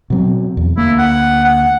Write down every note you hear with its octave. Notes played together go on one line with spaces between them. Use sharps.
B2 F#3 C4
E2
D2 A#3 E4
F#5
F#5